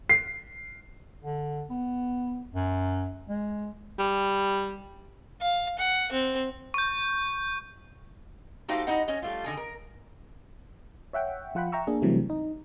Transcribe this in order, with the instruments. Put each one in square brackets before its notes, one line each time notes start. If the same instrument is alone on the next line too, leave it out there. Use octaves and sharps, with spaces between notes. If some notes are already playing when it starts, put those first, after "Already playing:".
[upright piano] C7
[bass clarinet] D3
B3
F#2
G#3
[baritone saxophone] G3
[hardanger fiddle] F5
F#5
C4
[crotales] C#6 G6
[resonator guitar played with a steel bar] A3 D#4 F#4 G4 C5 F5
D#4 E4 D#5 F#5
C#4 C#5 D#5
G3 A3 F4
D3 D#3 G#5
A#4
[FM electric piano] C#5 E5 F#5 G5
F3 F4 F#5 G5 B5
E5 G5 A#5 C#6 E6
A#3 D4 G#4
C3 E3 F#3 G3 A3
D#4